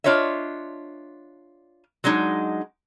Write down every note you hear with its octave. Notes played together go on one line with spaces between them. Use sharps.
D4 F4 C#5 D#5 E5
F#3 G#3 D4 D#4